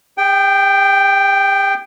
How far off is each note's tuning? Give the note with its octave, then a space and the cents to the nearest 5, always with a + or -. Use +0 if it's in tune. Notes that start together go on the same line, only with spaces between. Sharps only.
G#4 -45 G5 +0